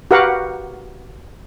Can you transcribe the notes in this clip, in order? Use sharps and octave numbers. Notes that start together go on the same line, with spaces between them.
F#4 G4 A#4 B4 F5 F#5